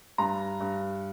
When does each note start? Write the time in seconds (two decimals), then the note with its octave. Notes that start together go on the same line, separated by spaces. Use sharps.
0.18 G2 A#5
0.60 G2